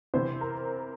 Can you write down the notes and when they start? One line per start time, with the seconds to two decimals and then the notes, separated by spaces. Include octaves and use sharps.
0.14 C3 E3 C5
0.41 A#4